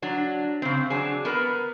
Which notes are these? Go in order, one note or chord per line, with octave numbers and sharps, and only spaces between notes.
F#3 D4
C#3 C4
F#3 D4 G#4
B3 A#4 B4